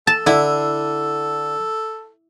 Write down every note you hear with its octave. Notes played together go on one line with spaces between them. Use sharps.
A4 A5
D3 E4